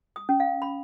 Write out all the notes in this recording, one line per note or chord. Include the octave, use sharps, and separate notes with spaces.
D#6
C#4
F5
B5